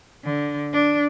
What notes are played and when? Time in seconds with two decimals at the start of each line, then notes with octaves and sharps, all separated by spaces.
0.24 D3
0.73 D4